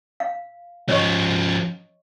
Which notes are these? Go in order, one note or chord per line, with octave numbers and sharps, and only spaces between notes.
F5
F3 C#4 C#5 D#5 C#6